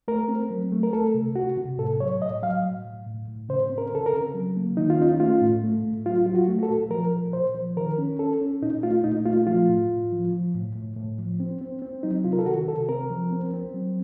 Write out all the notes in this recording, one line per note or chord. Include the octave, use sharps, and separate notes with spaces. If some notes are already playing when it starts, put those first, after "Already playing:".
A3 A#4
C4
F#3
A3
A#4
A3 A4
C3
C3 F#4
C3
A2 A4
F#3 C#5
A2 D#5
F#3 F5
A2
A2
A2
A2
C#3 C5
C4
A#4
C#3 A4
A#4
C#3
F#3
A#3
D#3 D#4
F4
C#4 D#4
A3 F4
A2
A3
A2
F#3 F4
F#3 F4
F#4
A3
F#4
A4
A#2
F3 A#4
A#2
A#2 C5
F3
D#3 A#4
C#4
C#4 A4
C#4
A#2 D#4
A3 F4
A#2 D#4
A3 F4
F3 F4
A2
A2
F3
F3
A2
A2
A2
F3
C4
C4
C4
F#3 D#4
C3 F4
A#4
A4
D#3 F#4
C3 A4
C4 A#4
F3
C4
C4
F#3